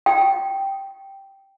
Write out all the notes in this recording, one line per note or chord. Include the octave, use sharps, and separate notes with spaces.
G5